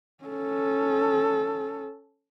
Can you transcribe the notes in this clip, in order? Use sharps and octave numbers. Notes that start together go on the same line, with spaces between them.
C#4 A4